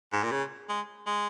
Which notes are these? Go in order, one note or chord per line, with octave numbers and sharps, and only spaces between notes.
G#2
A#2
C#3
G#3
G#3